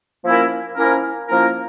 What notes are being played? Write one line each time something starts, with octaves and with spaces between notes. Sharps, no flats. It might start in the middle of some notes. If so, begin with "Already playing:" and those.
F3 A#3 C#4 E4 A#4
F3 A#3 C#4 E4 A#4
F3 A#3 C#4 E4 A#4